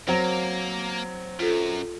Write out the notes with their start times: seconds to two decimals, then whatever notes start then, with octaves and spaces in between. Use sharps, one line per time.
0.07 F#3 A#3 C4
1.39 F#2 F4 A4